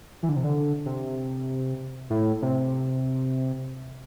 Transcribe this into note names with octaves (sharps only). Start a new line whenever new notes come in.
E3
D3
C3
D3
C3
A2
C3